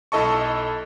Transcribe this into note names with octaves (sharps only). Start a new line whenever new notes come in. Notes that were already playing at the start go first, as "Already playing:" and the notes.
B1 E4 A4 D#5 A5 C#6